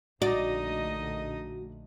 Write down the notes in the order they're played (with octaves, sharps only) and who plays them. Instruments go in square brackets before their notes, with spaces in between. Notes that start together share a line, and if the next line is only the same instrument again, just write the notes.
[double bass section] A#1 D3 A3 [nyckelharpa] D#4 D#5 [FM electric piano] F#4 [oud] D5